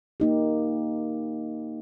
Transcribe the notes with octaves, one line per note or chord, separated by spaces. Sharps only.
A#3 D#4 G4